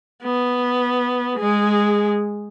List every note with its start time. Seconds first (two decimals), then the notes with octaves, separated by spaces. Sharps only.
0.23 B3
1.36 G#3 G#4